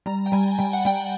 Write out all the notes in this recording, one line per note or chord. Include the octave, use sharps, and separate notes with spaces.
G3 A#5
G5
G3 G#5
G3 G5
F#5
G3 G5